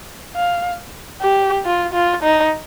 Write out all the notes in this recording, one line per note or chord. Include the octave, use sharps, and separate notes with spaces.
F5
G4
F4
F4
D#4